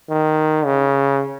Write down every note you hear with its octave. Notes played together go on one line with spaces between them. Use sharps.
D#3
C#3